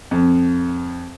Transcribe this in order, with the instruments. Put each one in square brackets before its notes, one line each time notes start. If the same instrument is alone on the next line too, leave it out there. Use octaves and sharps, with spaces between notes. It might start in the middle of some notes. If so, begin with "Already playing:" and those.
[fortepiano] F2